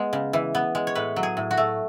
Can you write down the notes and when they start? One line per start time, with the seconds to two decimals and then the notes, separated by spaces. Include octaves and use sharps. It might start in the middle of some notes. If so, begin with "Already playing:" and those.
Already playing: G#3 B3
0.13 C#3
0.33 E3
0.55 B3
0.75 G#3
0.87 C#5
0.95 A2 B4
1.16 F#3
1.23 G#4
1.37 A2
1.51 F#4
1.58 A3